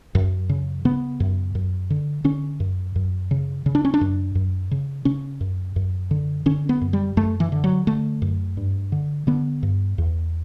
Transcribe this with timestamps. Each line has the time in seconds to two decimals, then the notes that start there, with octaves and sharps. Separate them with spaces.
0.15 F#2
0.49 C#3
0.85 C#3 B3
1.20 F#2
1.55 F#2
1.90 D3
2.24 D3 C#4
2.60 F#2
2.96 F#2
3.31 C#3
3.66 C#3
3.75 D4
3.85 C#4
3.94 D4
4.01 F#2
4.35 F#2
4.71 C#3
5.05 C#3 C#4
5.41 F#2
5.76 F#2
6.11 D3
6.46 D3 C#4
6.69 B3
6.81 F#2
6.93 G3
7.17 F#2 A3
7.40 E3
7.52 D3
7.64 F#3
7.87 D3 A3
8.22 F#2
8.57 G2
8.92 D3
9.27 D3 B3
9.63 G2
9.98 E2